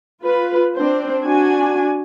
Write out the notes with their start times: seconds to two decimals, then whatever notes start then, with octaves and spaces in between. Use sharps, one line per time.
0.23 F4 B4
0.76 C4 D4 C5
1.24 D4 F#4 G#5